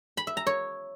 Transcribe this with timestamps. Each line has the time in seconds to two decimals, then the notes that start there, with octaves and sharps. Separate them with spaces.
0.17 B5
0.27 E5
0.37 A#5
0.47 C#5